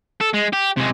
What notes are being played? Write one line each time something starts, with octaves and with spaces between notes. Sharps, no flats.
A4
G#3
G4
C3 G#3